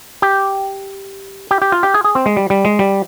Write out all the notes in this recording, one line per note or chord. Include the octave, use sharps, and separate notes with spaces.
G4
G4
G4
F4
G4
G#4
G#4
C4
G#3
G3
G3
G#3
G3